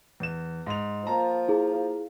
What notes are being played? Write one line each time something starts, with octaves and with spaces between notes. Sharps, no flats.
E2 E7
G#2 F7
F3 A#3 A5 A#5
E4 G#4